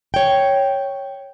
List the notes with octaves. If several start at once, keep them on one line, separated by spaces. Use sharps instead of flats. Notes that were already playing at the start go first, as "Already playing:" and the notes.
C#5 G5